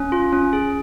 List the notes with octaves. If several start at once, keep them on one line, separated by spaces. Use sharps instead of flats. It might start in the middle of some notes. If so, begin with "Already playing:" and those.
Already playing: C#4
F4
C#4
G#4